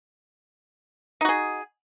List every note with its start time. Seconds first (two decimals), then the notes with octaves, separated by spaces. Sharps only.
1.21 D#4
1.25 F#4
1.29 G#4